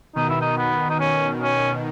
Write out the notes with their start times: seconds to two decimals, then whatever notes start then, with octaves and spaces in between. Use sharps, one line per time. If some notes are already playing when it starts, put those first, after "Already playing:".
0.16 B2 D#3 D#4
0.29 E4
0.41 D#4
0.58 B3
0.90 D#4
0.99 C#4
1.41 C#4